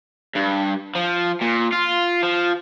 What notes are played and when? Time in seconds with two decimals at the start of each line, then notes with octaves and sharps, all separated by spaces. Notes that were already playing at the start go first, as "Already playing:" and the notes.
0.35 G2
0.95 F3
1.41 A#2
1.72 F4
2.23 F3